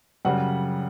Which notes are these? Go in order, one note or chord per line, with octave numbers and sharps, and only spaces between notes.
F#2 C#3 G3 F#5